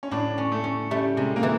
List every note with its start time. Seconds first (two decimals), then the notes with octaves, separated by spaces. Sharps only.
0.03 C#4
0.11 A2 D4
0.38 C#4
0.52 A3
0.64 C#4
0.91 G3 A3
1.17 C3 G#3
1.36 A#3
1.43 E3